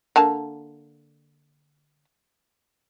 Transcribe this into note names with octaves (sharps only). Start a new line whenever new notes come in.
D3 A#3 A5